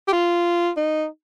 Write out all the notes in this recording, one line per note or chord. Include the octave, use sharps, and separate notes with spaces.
G4
F4
D#4